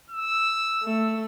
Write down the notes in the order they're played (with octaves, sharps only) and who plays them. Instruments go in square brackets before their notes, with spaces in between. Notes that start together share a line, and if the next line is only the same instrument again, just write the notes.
[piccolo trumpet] E6
[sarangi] A3